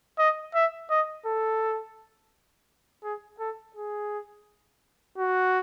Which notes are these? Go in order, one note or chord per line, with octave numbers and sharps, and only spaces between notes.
D#5
E5
D#5
A4
G#4
A4
G#4
F#4